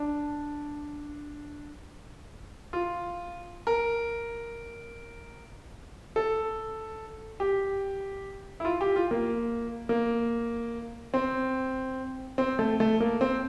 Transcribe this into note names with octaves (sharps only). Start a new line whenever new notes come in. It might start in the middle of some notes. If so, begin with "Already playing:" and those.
Already playing: D4
F4
A#4
A4
G4
E4
F4
G4
F4
A#3
A#3
C4
C4
A3
A3
A#3
C4